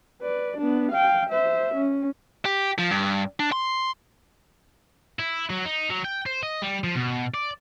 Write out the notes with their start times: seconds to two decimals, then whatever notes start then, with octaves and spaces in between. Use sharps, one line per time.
0.22 B4 D5
0.58 B3 D4
0.92 F5 G5
1.30 C5 E5
1.75 C#4
2.45 G4
2.78 F3
2.90 G2
3.40 D4
3.52 C6
5.19 E4
5.50 F#3
5.65 D#4
5.90 F#3
6.05 G5
6.26 C5
6.43 D#5
6.62 G3
6.84 F3
6.95 B2
7.34 D5